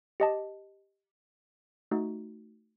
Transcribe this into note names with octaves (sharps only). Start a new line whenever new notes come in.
G4 D#5 A5
A3 D#4 F#4